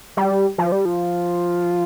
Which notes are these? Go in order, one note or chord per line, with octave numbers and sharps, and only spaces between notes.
G3
F3
G3
F3